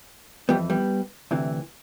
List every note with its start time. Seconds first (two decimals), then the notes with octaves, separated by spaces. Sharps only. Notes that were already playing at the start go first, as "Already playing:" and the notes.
0.49 F2 E3 G3 B3
0.70 G3 B3
1.31 D2 C3 E3